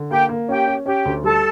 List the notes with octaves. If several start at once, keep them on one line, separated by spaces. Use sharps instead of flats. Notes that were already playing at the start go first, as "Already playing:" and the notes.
Already playing: D3
A#3 G4 G5
A#3
C#4 G4 G5
C#4
C#4 G4 G5
D2
G3 A4 A5